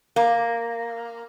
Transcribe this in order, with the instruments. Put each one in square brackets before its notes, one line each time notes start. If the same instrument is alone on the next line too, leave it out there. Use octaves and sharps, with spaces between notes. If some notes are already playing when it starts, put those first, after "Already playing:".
[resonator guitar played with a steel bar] A#3